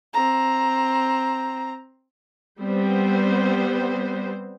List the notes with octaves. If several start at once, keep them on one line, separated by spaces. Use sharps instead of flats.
C4 A#5
G3 B3 C4 C5